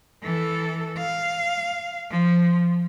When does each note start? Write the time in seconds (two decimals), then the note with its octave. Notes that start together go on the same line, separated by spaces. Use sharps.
0.23 E3 A4
0.98 F5
2.10 F3